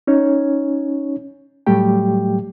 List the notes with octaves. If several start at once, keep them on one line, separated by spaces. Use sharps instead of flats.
C#4 D#4 C#5
A2 F#3 G3 A3 G4 G5